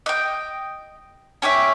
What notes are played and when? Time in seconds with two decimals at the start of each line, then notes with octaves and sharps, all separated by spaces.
0.06 D#5 G5
1.42 C#4 G4 C#5 E5